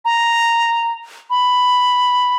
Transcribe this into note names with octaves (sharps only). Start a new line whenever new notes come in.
A#5
B5